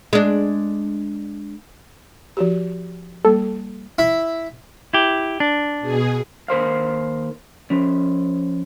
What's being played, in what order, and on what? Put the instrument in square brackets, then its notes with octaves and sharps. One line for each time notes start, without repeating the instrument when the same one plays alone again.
[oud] G#3 D4
[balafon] F3 F#4 G4
[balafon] G3 A#3 [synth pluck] A4
[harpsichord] E4
[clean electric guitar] E4 G4
D4
[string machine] B2 G#4
[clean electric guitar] D#2 A#4 C5 F5
F3 C#4